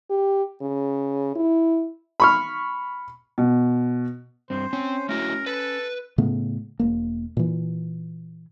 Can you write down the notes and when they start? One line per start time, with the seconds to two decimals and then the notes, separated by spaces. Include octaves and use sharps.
0.10 G4
0.62 C#3
1.36 E4
2.20 B5 C#6 F6
3.38 B2
4.50 G2 C4 C5
4.73 C4 C#4
5.09 A3 E4 F#4 A#4
5.46 A4 B4
6.18 A2 C#3 A3 B3
6.79 E1 A#3
7.37 A#2 E3